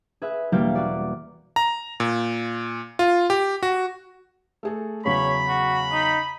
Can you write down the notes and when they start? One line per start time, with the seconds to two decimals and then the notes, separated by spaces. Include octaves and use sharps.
0.22 G#4 B4 E5
0.52 E1 G3 A#3 E4 G4 G5
0.75 F#4 D5
1.56 A#5
2.00 A#2
2.99 F4
3.30 G4
3.63 F#4
4.63 A3 G#4 A4
5.05 E2 C#3 F#3 C#5 B5
5.48 F#4
5.92 D#4